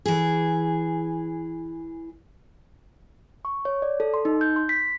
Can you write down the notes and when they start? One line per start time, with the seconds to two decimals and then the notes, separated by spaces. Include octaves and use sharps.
0.06 E3 G#4
3.45 C#6
3.65 C#5
3.82 D5
4.00 A4
4.14 C6
4.25 D#4
4.41 G6
4.56 C6
4.69 B6